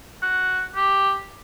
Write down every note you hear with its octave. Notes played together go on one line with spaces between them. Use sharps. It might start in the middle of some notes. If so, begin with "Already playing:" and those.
F#4
G4